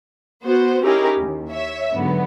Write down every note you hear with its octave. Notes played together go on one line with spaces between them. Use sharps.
B3 F#4 C5
C#4 D#4 E4 G4 G#4 A#4
D#2
C#5 E5
G#2 D3 F#3 B3